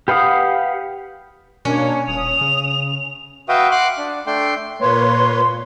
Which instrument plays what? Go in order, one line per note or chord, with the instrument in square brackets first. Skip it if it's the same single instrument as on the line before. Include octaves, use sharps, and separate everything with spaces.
[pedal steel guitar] G4 B4 F5 F#5 D#6
[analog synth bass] B2 [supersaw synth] A#3 D4 C#5 [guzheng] C#4
[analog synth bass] D#1 [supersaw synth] D#6 [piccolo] F7
[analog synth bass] C#3
[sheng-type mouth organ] F#4 B4 E5 F5 G5 D#6
F#5 C6 D6 F#6
D4
A3 D4 G5 C6
[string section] A#2 [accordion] A#3 B4 C#5 [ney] C6